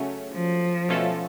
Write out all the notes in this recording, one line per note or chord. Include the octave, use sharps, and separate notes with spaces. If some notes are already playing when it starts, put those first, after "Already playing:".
Already playing: C#3 F#3 A3 C#4
F3
B2 A3 C#4 F4 A4